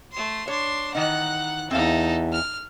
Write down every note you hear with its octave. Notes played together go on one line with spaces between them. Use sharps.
A3 C6
D4 C#5 C6
D#3 E3 D#4 F#5 F#6
E2 C4 D#4 A4 E5 F5
F6